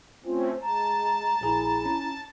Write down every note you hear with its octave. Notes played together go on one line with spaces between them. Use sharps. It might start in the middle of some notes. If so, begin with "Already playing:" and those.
A3 C4 C#4 F4 C5
G#3 A5 A#5
A#1 E4 G#4
C#4